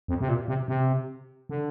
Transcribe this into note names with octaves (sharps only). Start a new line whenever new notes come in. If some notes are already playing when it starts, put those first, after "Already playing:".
F2
C3
A#2
C3
C3
D3